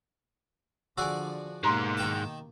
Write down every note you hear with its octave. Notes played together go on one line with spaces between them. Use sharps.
D3 F3 F#4 G#4 D5 G#5 E6
G#2 B2 A#3 G4 A#5 C6
D#3 G5 A5